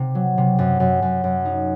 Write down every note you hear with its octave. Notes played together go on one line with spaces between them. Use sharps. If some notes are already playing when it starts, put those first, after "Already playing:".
Already playing: C3
F#3
C3
F#2
F#2
F#2
F#2
D#4